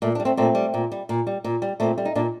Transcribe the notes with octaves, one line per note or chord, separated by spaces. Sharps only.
A#2 A3
G3 D4
A3 C4
A#2 A3 C4
G3
A#2
G3
A#2
G3
A#2
G3
A#2 A3 C4
G3
D#4
A#2 A#3 D4